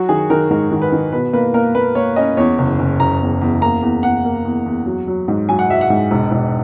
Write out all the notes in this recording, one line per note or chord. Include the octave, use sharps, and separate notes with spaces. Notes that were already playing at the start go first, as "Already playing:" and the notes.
Already playing: F#3 F#4
D#3 G#4
D#3 A#4
G#2 A#4
D#3
B4
D#3
B2 B4
A#3 B4
A#3 A#4
A#3 B4
A#3 C#5
C#4 D#5
E2 C#5
F#1
F#1
F#1 A#5
E2
E2
A#3 A#5
E2
E2 F#5
A#3
E2
E2
F#3
F#3
G#2
F#3 G#5
F#5
F#3 E5
F#5
G#2
E1
E1